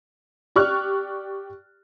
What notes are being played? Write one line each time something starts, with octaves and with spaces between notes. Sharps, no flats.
G4 D5 C#6 F6 F#6